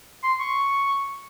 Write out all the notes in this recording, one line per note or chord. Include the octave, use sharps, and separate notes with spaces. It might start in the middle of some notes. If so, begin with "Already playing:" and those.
C6
C#6